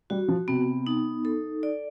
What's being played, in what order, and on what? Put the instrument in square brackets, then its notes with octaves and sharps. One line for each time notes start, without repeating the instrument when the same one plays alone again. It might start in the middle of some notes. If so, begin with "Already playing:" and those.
[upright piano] G3 [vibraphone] F#4
[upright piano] F3
[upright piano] C3 [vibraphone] B3
[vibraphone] D#4
A4
D5